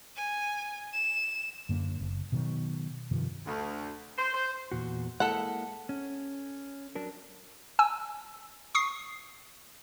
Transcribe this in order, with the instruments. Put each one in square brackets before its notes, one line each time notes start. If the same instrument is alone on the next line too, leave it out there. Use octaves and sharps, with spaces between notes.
[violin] G#5
E7
[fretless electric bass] F#2 D3 A#3
F#1
B2 D#3 F#3
G2 C3 D#3 F3
[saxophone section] D2
C5
C5
[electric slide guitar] E2 A#2 F#4
[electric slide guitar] G#3 A#3 E4 [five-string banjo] A4 F#5
[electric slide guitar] C#4
F#3 D4 A#4
[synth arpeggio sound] G#5 E6
C#6 D#6 C7